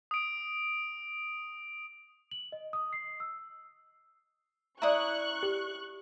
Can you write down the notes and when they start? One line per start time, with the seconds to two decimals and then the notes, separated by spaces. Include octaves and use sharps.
0.11 D#6 D7
2.31 F#7
2.52 D#5
2.73 D#6
2.93 C7
3.20 E6
4.82 E4 D5 A#5 C#6 D#6 F#6
5.43 G4